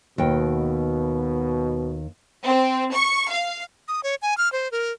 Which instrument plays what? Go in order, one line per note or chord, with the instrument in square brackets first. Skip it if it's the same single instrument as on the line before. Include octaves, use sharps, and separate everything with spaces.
[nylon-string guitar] D#2 G5 [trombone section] B2
[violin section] C4
C#6
F5
[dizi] D#6
C#5
G#5
F6
C5
A#4